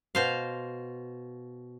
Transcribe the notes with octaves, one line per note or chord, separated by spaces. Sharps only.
B2 C5 F5